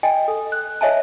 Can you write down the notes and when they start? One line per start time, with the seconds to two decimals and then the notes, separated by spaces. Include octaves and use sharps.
0.03 D#5 G5 G#5
0.28 A4
0.52 F#6
0.81 C#5 D#5 E5 G#5 A5